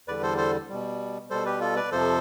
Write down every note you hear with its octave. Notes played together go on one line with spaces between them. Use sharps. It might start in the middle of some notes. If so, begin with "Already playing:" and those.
E2 D3 G3 B4 D5
A4 C5
A4 C5
B2 G3
B2 G3 A4 C5
G4 B4
F4 A4
B4 D5
F2 C3 F3 A4 C5